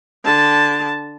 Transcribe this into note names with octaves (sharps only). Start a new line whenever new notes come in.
D3 A5